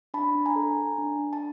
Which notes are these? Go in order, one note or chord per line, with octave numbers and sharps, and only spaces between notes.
D4 A5 B5
D4
G#5 A#5
A4
A4
D4
D4
A5